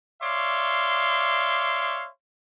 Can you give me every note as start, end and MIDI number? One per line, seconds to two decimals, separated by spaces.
0.22 2.08 73
0.22 2.08 74
0.22 2.08 76
0.22 2.08 77
0.22 2.08 84
0.22 2.08 86